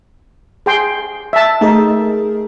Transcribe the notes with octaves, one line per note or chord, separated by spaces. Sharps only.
G#4 G5 C6
E5 A5
A3 D#4 G#4 A#4